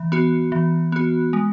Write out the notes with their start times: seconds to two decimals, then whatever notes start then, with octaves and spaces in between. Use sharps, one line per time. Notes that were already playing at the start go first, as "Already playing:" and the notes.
Already playing: E3
0.12 B3 F#4
0.52 E3
0.92 B3 F#4
1.33 G#3